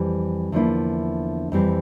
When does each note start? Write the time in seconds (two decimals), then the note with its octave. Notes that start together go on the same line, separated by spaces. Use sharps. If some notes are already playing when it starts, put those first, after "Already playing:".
Already playing: F2 E3 G3 C4
0.52 E2 D3 F3 A#3 E4
1.52 F2 E3 G3 C4